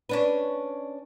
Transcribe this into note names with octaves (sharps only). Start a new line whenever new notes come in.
C#4 D4 B4